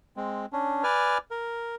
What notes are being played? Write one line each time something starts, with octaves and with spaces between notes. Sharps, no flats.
G#3 C4
C#4 D4
B4 D5 G#5 F6
A#4